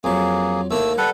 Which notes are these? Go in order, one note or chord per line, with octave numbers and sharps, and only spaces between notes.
F2 F#3 A#3 G#4
D#2 A3 A#3 E4 E6
G3 A4 B4 F#5